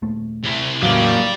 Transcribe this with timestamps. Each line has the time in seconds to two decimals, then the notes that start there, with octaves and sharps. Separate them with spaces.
0.02 D#1 A3
0.43 C3 E4
0.82 E2 A2 C#3 F#3 A#3 G4 D5 F5